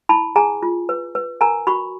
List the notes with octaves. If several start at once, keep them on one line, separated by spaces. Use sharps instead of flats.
E4 A5 B5
G#4 G#5 A#5
F4
B4
B4
A#4 G#5 A#5
F#4 B5 C#6